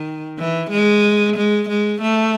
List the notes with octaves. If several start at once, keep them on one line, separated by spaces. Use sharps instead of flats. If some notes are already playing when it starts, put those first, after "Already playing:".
Already playing: D#3
E3
G#3
G#3
G#3
A3